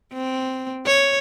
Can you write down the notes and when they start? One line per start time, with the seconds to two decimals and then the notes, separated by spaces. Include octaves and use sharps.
0.13 C4
0.86 C#5